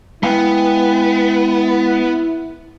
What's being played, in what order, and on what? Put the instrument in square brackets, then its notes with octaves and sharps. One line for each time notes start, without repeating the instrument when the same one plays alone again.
[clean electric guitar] G#3 F5 G5 [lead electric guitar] B3 [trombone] E4